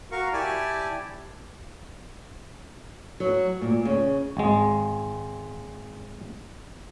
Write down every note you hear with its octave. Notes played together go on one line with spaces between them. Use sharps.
F#4 A#4 F5 C#6
E4 G4 D5 G#5 A5
F#3
A#2
C#3
G#1 G#3